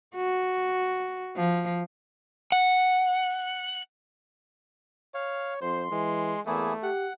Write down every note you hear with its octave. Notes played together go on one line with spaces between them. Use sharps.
F#4
F3
F#5
C#5 F5
F2 C5 C6
E3 G#3
E2 A3 A#3 E4 G#4
G4 F#5